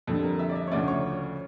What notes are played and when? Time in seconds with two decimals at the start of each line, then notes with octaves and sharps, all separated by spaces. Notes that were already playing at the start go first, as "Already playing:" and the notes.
0.07 F2 D3 G3 A4
0.24 A#4
0.39 E5
0.49 D5
0.55 E5
0.67 C#5
0.72 D2 C#3 F3 A3 C#4 D5
0.88 C#5